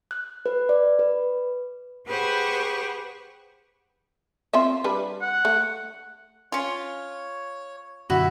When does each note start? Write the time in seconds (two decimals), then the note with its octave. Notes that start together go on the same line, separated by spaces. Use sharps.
0.11 F#6
0.46 B4
0.69 D5
0.99 B4
2.06 G4 G#4 B4 C5 F#5 C#6
4.53 C4 F4 E5
4.84 G3 D4 B4
5.22 F#5
5.45 A3
6.52 C#4 F4 C#5
8.10 F#2 B2 D3 E4 F#4 B5